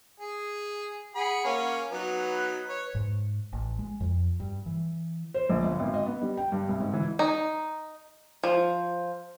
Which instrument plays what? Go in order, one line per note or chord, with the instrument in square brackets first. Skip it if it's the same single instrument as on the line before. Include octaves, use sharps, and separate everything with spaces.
[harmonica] G#4
[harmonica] G#4 B5 [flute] F#5
[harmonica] A#3 C#4
[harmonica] F#3 B3 D#4 [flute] B4
[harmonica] C#5
[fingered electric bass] G#2
A1
G#3
F2
G2
E3
[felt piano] C5
A#1
G1
G#1
D#5
B3
G3
G5
G2
C2
G#2
E3
[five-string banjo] D#4
F3